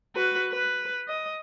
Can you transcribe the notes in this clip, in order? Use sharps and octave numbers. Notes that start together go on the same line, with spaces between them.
F#4 B4
B4
D#5